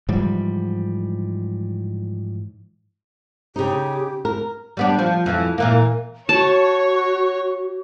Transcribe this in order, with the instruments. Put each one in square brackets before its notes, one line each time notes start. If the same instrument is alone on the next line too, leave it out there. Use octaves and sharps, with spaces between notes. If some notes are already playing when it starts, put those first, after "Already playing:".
[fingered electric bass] G#2 E3 F3 G3
[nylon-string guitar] C#3 D#4 [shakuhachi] G4
[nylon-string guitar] A#4
[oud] G3 B3 D4
F3
F2 E3
A#2 E3 A#3
[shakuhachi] F#4 [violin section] C#5 [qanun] A5